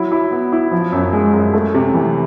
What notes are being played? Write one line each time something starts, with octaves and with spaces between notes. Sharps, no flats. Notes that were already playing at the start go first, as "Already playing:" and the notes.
Already playing: F#3 E4
E4
B3
E4
F3
F#2
G#3
F#2
A3
C3
E3